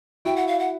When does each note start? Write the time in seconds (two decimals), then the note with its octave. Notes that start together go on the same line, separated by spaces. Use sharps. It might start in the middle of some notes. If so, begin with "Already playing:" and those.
0.25 E4 F#4 G5
0.36 F#5
0.47 F5
0.60 F#5